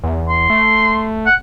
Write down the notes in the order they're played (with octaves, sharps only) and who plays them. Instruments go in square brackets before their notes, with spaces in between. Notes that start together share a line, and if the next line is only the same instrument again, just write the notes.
[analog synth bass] E2
[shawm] C6
[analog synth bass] A3
[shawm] F#5